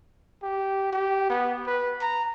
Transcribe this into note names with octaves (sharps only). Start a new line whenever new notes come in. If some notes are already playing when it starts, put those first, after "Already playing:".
G4
G4
B3
B4
A#5